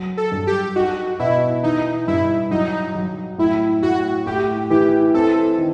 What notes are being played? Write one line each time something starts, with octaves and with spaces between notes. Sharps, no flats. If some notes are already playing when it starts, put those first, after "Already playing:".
Already playing: F#3
A4
G2
G4
D#4 F#4
B2 E4
E3 D#4
G2 E4
F#3 D#4
F#3
A2 E4
A2 F#4
A2 G4
E3 G4
C4 A4
D#3